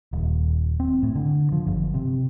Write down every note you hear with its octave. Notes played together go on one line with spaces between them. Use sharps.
D#1
C4
A2
D3
F3
G1
C3